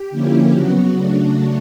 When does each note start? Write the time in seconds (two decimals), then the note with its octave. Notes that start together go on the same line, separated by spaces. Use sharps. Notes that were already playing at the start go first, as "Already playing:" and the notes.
Already playing: G4
0.10 D3 F3 A#3 C#4 E4
0.52 C#3 F#3 B3 F#4
0.94 C#3 F#3 A3 D4 F#4